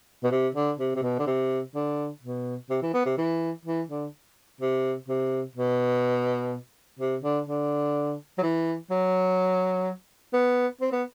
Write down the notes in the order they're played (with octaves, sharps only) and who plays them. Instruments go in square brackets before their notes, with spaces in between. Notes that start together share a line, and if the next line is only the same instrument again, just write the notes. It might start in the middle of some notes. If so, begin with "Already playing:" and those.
[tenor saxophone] B2
C3
D3
C3
C3
B2
D3
C3
D3
B2
C3
E3
B3
C3
E3
E3
D3
C3
C3
B2
C3
D3
D3
F#3
E3
F#3
B3
C4
B3